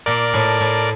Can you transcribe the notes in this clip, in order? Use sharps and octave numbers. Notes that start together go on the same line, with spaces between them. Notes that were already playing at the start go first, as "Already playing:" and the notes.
A#2 A#4 D5
A2
A2